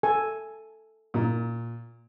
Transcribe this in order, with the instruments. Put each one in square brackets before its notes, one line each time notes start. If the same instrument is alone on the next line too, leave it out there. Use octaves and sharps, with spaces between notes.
[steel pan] A4 G#5
[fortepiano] A#2